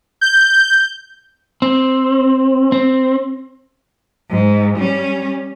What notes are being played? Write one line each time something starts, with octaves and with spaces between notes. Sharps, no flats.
G6
C4
C4
G#2
G3 C#4